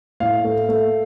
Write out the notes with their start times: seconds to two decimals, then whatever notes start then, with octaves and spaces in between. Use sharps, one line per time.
0.20 A2 F5
0.44 A3
0.69 A3